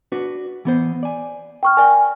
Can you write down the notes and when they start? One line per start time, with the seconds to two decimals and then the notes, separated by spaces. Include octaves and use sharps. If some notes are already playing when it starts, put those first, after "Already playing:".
0.12 D4 F#4 B4
0.65 E3 B3 C5
1.03 D5 G#5
1.63 G5 C#6 F6
1.77 A#4 D5 G5 G#5